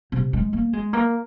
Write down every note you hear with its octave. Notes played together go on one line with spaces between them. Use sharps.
C3
G#3
A#3
G#3
A#3